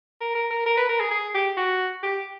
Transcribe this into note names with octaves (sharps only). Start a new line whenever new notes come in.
A#4
A#4
A#4
A#4
B4
A#4
G#4
G#4
G4
F#4
G4